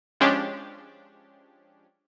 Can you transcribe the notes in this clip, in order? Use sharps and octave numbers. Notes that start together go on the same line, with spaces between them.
F3 G#3 C#4 D4 G4